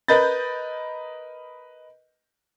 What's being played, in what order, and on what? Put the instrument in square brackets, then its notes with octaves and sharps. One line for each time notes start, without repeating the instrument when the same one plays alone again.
[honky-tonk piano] A#4 B4 D#5 B5 G6 A6